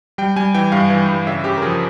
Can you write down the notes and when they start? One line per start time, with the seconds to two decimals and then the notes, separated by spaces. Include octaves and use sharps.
0.18 G3 G5
0.36 G3 G#5
0.54 E3 G5
0.72 G2 F5
0.90 E3
1.08 G2
1.27 C#3 E5
1.44 C#3 G4
1.57 A#4
1.62 F3 G#4